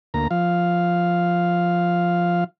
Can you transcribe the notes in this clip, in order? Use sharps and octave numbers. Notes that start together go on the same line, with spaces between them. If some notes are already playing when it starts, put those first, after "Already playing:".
D2 A#3 A#5
F3 F5